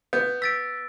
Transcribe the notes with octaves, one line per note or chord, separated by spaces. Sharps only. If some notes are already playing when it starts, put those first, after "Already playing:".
B3 G6
E6 A6 B6 D7